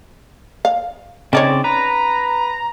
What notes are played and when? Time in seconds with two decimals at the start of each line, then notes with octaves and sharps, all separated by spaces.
0.65 F5
1.33 C#3 C4 C#4 D#4 C#5 D5
1.64 B4 A#5